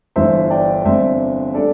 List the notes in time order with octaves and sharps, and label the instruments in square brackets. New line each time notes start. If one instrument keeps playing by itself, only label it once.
[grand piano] G1 G2 E3 C5 E5
D5 G5
G1 G2 G3 C4 C5 E5
G3 D4 A4 D5